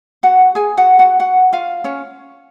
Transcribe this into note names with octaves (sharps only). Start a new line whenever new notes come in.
F#4 F#5
G#4 G#5
F#4 F#5
F#4 F#5
F#4 F#5
F4 F5
C#4 C#5